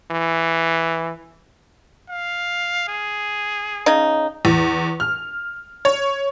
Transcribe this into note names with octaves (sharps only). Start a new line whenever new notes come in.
E3
F5
G#4
C#3 D#4
E2
F6
C#5